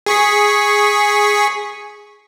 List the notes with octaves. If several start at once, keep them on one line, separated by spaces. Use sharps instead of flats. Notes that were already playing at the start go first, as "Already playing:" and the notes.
G#4 C#6 B6